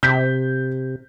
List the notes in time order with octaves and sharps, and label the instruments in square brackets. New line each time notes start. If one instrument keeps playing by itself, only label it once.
[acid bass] C3 [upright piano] G6 B6